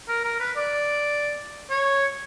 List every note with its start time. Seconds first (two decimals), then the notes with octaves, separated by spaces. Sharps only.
0.08 A#4
0.24 A#4
0.40 B4
0.56 D5
1.70 C#5